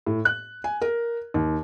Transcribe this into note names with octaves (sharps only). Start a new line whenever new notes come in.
A2
F#6
G#5
A#4
D#2